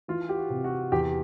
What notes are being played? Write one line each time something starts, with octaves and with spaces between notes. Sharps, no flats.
E3 F4
G4
F#4
C3
F#4
E2 G4